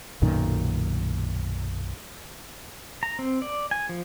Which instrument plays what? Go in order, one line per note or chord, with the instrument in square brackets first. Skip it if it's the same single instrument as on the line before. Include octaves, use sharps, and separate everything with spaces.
[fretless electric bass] B1 F#2 A#2 D#3
[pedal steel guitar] A#5
C4
D5
G#5
F3